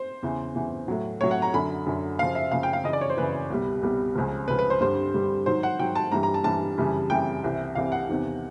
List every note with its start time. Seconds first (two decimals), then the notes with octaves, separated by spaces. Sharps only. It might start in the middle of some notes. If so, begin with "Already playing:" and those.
Already playing: C5
0.23 E2 C#3 E3
0.55 E2 C#3 E3
0.88 A2 F#3
1.21 A2 F#3 C#5
1.31 F#5
1.42 A#5
1.54 F#2 D3 F#3 B5
1.86 F#2 D3 F#3
2.19 F#2 C#3 F3 F5
2.35 E5
2.52 F#2 C#3 F3 F5
2.63 G5
2.73 F5
2.84 F#2 C#3 E3 D#5
2.93 D5
3.01 C#5
3.10 C5
3.17 F#2 C#3 E3 B4
3.50 C2 B2 G3
3.82 C2 B2 G3
4.16 C#2 C#3 F3
4.48 C#2 C#3 F3 B4
4.59 B4
4.70 C5
4.81 G2 D3 G3 C5
5.14 G2 D3 G3
5.46 G#2 D#3 F#3 C5
5.63 F#5
5.79 G#2 D#3 F#3 G5
5.96 A5
6.12 G2 E3 G3 A#5
6.23 A#5
6.34 A5
6.44 G2 E3 G3 A5
6.78 F#2 C#3 E3 G3
7.10 F#2 C#3 E3 G3 G5
7.44 C2 C3 E3
7.75 C2 C3 E3 F5
7.92 F#5
8.09 E2 C3 D#3